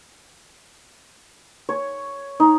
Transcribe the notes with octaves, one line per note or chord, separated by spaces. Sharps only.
C#5
D#4